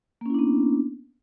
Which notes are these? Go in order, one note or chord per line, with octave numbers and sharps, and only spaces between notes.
A#3 B3 C#4 D4 E4